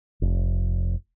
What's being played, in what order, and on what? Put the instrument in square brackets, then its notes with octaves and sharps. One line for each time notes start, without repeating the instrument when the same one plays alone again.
[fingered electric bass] F1